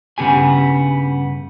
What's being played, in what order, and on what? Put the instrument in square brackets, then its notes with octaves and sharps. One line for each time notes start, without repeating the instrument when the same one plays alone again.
[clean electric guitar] G2 C#3 B3 G4 G#5